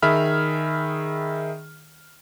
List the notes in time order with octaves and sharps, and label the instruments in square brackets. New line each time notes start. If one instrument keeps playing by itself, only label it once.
[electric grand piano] D#3 G#4 E5 B5 F6